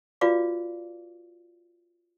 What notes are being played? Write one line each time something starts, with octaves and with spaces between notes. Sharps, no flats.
F4 F#4 B4 D5 F5 D6